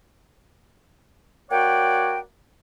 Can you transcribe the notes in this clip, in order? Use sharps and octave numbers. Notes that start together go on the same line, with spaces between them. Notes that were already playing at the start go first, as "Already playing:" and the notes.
A#3 F#4 C#5 D5 F#5 G5